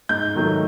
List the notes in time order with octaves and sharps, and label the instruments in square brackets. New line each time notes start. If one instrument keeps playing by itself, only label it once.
[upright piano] G#2 G6
D#3 F#3 A3